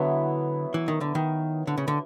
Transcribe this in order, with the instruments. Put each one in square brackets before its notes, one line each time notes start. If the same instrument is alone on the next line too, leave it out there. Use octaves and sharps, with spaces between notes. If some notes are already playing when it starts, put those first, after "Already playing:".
Already playing: [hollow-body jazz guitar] D3 [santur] F#3 B3 E4
[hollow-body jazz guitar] E3
D#3
D3
D#3
D3
C#3
D3